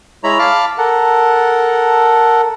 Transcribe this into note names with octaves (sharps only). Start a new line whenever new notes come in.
G#3 E4 C#5 A#5 B5
F5 A5 B5 D6 F6
A4 A#4 F#5